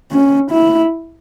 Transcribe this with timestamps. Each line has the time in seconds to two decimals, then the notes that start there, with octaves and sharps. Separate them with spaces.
0.12 C#4
0.51 E4